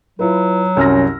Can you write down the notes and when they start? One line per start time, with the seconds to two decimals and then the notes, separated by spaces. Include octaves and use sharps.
0.19 F#3 E4 F4 B4
0.77 C2 F#2 C#4 E6 F6 A#6